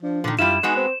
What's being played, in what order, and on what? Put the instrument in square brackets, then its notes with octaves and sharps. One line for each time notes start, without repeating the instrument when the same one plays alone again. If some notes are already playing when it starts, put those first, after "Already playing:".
[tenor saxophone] F3 [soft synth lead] D4
[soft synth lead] A#2 [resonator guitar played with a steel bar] D3 D#3
[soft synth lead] F#2 [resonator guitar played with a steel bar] G3 E4 [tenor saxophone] F4 [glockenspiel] E7
[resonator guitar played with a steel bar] G#3 B3 F#4 [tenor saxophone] D#4 [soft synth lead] G#5
[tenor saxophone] C4 [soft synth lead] C5